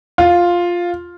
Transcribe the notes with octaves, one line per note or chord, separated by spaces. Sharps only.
F4